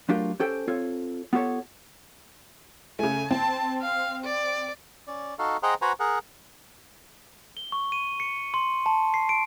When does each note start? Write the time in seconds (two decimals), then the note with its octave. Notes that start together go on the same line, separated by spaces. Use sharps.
0.09 F#3 A3 D4 F4 G4 A#4
0.40 C#4 G4 A4 C5 G5
0.68 C4 F4 A4 C#5
1.33 B3 F4 G4 A4 C#5
2.99 C#3 A3 G#5
3.31 C4 A5
3.81 F5
4.24 D5
5.07 C#4 D5
5.39 D#4 F#4 A4 F5
5.63 G#4 C5 D#5 F#5 G5 A#5
5.82 F#4 B4 C5 F#5 G#5 A#5
6.00 G#4 A#4 F#5
7.57 G7
7.72 C#6
7.92 D#7
8.20 C#7
8.54 C6
8.86 A5
9.14 C7
9.29 D7